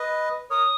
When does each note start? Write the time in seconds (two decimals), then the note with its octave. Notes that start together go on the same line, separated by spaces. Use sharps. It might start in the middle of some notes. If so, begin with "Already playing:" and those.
Already playing: B4 D#5
0.50 A#4 C#5 D#6